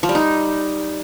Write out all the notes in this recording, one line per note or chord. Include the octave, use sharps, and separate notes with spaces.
F3
G3
D#4